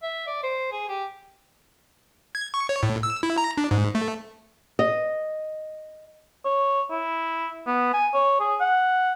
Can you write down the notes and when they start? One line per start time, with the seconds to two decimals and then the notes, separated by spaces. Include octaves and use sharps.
0.02 E5
0.27 D5
0.43 C5
0.72 G#4
0.88 G4
2.35 G#6
2.54 C#6
2.69 C#5
2.83 A2
3.03 E6
3.23 E4
3.38 A#5
3.57 D4
3.71 G#2
3.95 A3
4.79 D#5
6.45 C#5
6.90 E4
7.67 B3
7.93 G#5
8.14 C#5
8.40 G#4
8.61 F#5